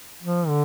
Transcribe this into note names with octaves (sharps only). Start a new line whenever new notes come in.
F3
D3